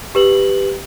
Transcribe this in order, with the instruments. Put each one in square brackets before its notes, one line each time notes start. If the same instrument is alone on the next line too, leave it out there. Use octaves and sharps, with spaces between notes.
[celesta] G4 B4 F#7